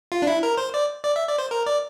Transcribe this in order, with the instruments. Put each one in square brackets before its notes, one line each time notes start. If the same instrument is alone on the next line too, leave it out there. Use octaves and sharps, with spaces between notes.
[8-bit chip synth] F4
D4
E4
A#4
C5
D5
D5
E5
D5
C5
A#4
D5